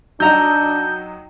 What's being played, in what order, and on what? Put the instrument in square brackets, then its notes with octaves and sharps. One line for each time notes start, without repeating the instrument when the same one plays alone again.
[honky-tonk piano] F#3 D#4 F#4 [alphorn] D4 [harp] G5 A#5 E6 [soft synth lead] G6